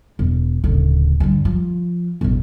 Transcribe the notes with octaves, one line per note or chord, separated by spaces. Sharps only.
E1
D1 C#3
G2 D3
F3
E1 A1